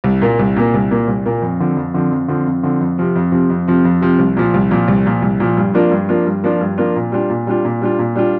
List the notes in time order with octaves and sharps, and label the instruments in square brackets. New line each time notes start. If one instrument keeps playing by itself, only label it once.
[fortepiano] C2
A#2 A#3
C2
A#2 A#3
C2
A#2 A#3
C2
A#2 A#3
F2
D3 F3 C4
F2
D3 F3 C4
F2
D3 F3 C4
F2
D3 F3 C4
F2
C3 F3 C4
F2
C3 F3 C4
F2
C3 F3 C4
F2
C3 F3 C4
C2
A#2 F3
C2
A#2 F3
C2
A#2 F3
C2
A#2 F3
G2
F3 A#3 D4 F4
G2
F3 A#3 D4 F4
G2
F3 A#3 D4 F4
G2
F3 A#3 D4 F4
A#2
G3 D4 F4
A#2
G3 D4 F4
A#2
G3 D4 F4
A#2
G3 D4 F4